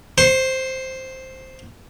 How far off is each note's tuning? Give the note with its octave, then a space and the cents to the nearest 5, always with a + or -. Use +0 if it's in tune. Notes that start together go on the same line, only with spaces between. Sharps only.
C5 +0 C6 +45